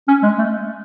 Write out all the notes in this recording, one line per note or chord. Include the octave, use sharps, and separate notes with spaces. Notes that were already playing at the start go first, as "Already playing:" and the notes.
C#4
G#3
A3